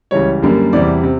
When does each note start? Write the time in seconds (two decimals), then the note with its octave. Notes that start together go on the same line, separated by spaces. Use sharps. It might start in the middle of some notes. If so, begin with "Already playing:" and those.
0.11 C#2 C#3 E3 G3 C#5
0.42 F#2 D3 G3 A#3
0.73 E2 C3 E3 G3 D5
1.04 C3